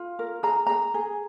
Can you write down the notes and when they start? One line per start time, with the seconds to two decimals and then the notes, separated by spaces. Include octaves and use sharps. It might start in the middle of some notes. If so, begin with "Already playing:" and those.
Already playing: F4
0.19 A#4
0.43 G#4 A#5
0.67 G#4 A#5
0.94 G#4